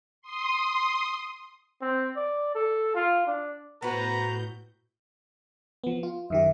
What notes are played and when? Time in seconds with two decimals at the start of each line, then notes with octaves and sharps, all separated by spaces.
0.22 C6 D#6
1.82 C4
2.16 D5
2.55 A4
2.95 F4
3.27 D4
3.82 A2 B3 C4 F#4 B4 A#5 G6
5.84 F3 B3
6.03 F4
6.30 F#2 D#3 G4 E5